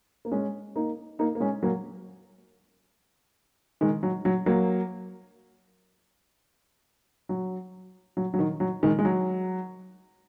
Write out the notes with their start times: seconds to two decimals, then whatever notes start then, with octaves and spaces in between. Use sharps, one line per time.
0.25 A#3
0.31 G#3 C#4
0.76 A#3 D#4
1.19 A#3 D#4
1.35 A#3
1.40 G#3 C#4
1.63 F#3 A#3
3.81 D#3 G#3
4.03 F#3
4.25 F#3
4.46 F#3 A#3
7.29 F#3
8.17 F#3
8.34 F#3
8.39 D#3
8.60 F#3
8.83 D#3 G#3
8.99 G#3
9.05 F#3